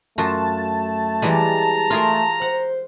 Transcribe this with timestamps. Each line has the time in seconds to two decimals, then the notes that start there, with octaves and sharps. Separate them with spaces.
0.18 F#2 A3 F4 F#4 A5
1.22 E3 G3 G#3 A#5
1.90 A3 F4 G#4 A#4
2.41 C5 F#5